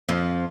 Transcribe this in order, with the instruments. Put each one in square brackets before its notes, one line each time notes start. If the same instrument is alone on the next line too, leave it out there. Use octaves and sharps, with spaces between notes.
[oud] F2 F3